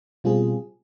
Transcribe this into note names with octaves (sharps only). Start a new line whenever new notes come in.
B2 G3 C4 F4 G#4